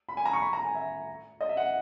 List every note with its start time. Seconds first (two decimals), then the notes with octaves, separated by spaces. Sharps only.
0.09 B5
0.17 G#5
0.25 A#5
0.33 C#6
0.42 B5
0.53 A#5
0.64 G#5
0.75 E5
1.41 D#5
1.49 E5
1.57 F#5